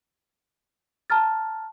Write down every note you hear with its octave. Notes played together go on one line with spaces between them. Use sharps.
A5 A#5 F6 A6